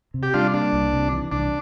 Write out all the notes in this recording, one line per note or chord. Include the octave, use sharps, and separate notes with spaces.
C3
G4
G3 D4 F4
A#3 D4
C2
C3
E3
C2 D4